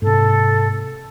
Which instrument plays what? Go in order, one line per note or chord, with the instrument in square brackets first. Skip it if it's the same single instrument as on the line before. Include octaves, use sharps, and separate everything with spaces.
[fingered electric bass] G#2 C3 [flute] A4